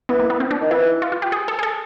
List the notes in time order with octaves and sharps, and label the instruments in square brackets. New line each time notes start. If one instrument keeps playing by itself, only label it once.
[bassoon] E3 [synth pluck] B3
[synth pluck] A#3
B3
C4
D4
[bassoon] D#3
[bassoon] E3 [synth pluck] E4
[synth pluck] F4
F4
G4
G#4
A4
G#4
A4